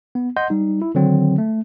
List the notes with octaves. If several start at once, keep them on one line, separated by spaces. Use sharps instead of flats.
B3
D#5 F#5 C6 G6
G3 D#4
E4
D3 D#3 F#3 C4
A3